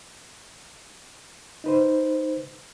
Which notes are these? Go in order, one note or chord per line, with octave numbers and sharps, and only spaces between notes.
D#4 B4 C5